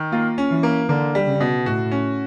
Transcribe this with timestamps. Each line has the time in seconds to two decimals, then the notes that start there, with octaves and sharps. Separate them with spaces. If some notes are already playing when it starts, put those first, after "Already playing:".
Already playing: D#3
0.12 A#3 F4
0.38 C#4
0.51 E3
0.63 A#3
0.89 D3 A#3
1.15 G3
1.27 C#3
1.40 B2
1.66 A2 F#4
1.91 C#4